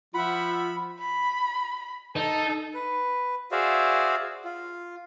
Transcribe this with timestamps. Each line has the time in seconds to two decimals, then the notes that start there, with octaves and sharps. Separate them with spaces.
0.14 F3 F4 E5 F#5 B5
1.00 B5
2.16 D#4 A4
2.74 B4
3.52 F#4 G#4 C5 D5 E5 F5
4.45 F4